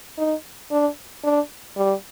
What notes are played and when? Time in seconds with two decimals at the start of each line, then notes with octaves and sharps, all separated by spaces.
0.18 D#4
0.71 D4
1.24 D4
1.77 G3